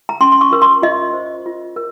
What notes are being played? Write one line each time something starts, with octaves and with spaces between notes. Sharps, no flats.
A#5
C#4 C6
C6
C#6
F4 A#4
C6
F4 D#5
C5
F4
A#4